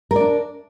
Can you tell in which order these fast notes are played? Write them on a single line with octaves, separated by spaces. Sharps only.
A#4 D5 D4